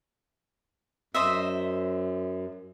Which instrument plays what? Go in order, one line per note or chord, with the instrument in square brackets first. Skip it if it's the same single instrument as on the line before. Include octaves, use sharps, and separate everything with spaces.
[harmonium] F#2 [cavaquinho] C5 D#5 E5